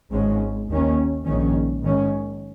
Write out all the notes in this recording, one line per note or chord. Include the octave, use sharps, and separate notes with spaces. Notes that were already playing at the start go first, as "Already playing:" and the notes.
G#1 G#2 G#3 C#4
D#2 D#3 A#3 C#4
A#1 G#2 D#3 C#4
G#2 D#3 C#4